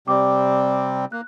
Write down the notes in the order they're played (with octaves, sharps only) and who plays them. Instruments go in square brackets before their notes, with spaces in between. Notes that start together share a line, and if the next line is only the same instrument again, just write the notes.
[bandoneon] C3 G3 C4 [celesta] D5 D6
[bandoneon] A#3 [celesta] F#6